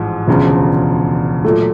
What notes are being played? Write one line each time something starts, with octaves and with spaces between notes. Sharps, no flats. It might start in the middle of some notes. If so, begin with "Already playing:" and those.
Already playing: A1 G#2 F3
E1 D2 C#3 F3
A#2 F#3 A3